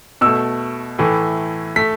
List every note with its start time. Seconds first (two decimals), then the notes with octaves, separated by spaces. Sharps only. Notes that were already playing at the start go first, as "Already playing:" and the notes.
0.21 B2 A3 E6
0.99 A2 E3 A3
1.76 A3 B6